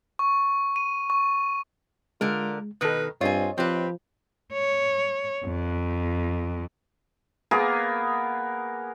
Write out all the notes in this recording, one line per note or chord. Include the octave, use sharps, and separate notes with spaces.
C#6
D#7
C#6
D3 G#3 F4 A#4
B2 D#3 A4 B4 D#6
G2 C4 F4 C#5 D#5 G#5
F3 C4 G4 B4
C#5
F2
A#3 B3 G#4 A#4